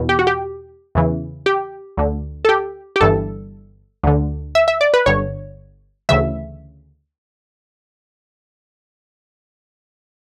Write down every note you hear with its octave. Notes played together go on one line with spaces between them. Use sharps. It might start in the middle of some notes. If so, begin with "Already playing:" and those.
Already playing: E2 B2
G4
F#4
G4
E2 C#3 E3
G4
D2 D3
A4
G4
G4
G1 G2 E3 A4
D2 D3
E5
E5
D5
B4
G1 G2 D3 C#5
D2 C#3 E3 E5